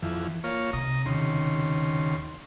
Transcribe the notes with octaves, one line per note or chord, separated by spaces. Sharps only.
F2 E3
A#3 F4 C#5
C3 A#5 D#6
D#2 C#3 C6